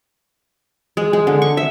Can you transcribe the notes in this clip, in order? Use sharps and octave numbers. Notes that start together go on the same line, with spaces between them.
G#3
G#3
D3
C#6
E5